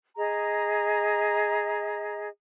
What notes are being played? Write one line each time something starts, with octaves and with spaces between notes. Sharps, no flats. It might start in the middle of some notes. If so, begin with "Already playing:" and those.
G#4 D#5 A#5